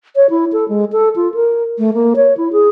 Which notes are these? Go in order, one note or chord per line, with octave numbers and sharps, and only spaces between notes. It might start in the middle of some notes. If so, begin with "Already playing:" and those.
C#5
E4
A4
G#3
A4
F4
A#4
A3
A#3
C#5
E4
G#4